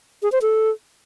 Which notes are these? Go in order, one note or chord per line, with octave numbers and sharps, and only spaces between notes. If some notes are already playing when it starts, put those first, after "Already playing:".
G#4
C5
A4